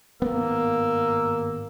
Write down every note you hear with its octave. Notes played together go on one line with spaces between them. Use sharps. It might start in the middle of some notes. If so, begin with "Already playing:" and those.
G#1 G2 A#3 B3 E6